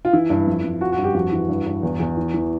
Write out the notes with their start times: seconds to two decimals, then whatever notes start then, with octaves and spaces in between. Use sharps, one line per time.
0.05 F4
0.13 E3 E4
0.30 G2
0.47 F2
0.64 F2
0.81 F3 F#4
0.92 F#4
0.98 G2
1.04 G4
1.14 F2 F#4
1.32 E3
1.49 G2
1.66 G2
1.83 E2
2.00 E2
2.17 E3
2.34 E3